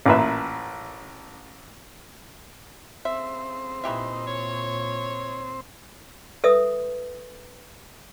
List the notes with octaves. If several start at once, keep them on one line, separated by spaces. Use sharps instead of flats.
A1 A#2 A#4 B4 E5
A2 C#3 C4 C5 E5
A#2 E3 D#4 G4 E5
C#5
A4 B4 E5 D#6